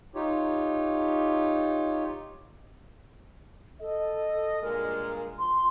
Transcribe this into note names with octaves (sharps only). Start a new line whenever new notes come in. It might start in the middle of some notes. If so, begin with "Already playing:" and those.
D#4 F4 G4 C#5
A4 D#5
G2 A#2 G#3 A#4
F3 C6